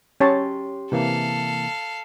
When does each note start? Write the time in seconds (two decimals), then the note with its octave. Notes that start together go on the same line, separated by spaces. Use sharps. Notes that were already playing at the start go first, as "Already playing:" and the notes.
0.20 C#4 G4 C#5 A5 C6
0.92 C3 E3 A#3 A4 F5